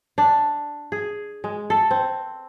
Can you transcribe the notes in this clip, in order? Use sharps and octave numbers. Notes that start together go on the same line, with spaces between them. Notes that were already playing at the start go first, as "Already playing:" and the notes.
D4
G#4
G#3
A4
C4